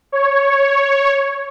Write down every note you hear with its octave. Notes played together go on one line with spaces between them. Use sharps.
C#5